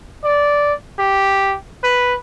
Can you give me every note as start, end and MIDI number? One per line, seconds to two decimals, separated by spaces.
0.24 0.73 74
0.99 1.55 67
1.83 2.15 71